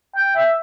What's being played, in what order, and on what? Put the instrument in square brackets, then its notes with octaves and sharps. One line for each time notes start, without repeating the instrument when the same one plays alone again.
[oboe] G5
E5